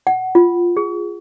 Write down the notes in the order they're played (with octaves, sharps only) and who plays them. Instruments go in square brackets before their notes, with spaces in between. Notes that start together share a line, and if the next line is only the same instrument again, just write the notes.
[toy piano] F#5
F4
G#4